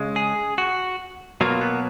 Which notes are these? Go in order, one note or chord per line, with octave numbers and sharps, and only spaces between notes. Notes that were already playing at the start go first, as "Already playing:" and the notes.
Already playing: C#3 G#3
G#4
F#4
B2 F#3 A#3 F4
B3